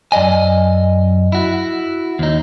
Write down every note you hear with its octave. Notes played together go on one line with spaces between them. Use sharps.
F#2 D5 D#5 G#5
E4 F#4
D#2 D#4